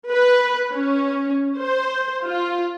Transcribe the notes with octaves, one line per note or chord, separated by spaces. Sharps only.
B4
C#4
C5
F4